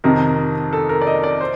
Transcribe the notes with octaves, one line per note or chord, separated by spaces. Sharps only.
F2 C3 D#3 A#4
A4
A#4
D5
D#5
D5
C5